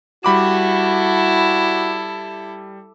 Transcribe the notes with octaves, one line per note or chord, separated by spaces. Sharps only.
G3 E4 F#4 A4 B5 D6